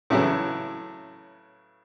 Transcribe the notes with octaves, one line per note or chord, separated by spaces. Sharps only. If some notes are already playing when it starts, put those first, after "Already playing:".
A2 C#3 E3 F#3